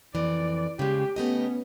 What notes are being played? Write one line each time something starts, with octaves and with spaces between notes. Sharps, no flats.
F2 E3 D5
C#3 G#3 G4
A3 B3 C#4 G4 D#5